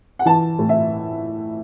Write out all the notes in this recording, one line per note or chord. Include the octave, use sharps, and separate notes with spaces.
F#5
E3 A5
A2
E5